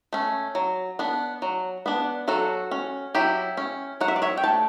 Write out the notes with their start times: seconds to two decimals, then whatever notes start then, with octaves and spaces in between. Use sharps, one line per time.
0.13 A3 C#4
0.55 F#3
0.99 B3 D4
1.42 F#3
1.86 B3 D4
2.28 F#3 F#4 A4
2.71 C#4
3.15 F#3 E4 G4
3.57 C#4
4.01 F#3 F#5
4.08 E5
4.16 D5
4.22 C#5 E5
4.37 G5
4.44 A3 D4 A5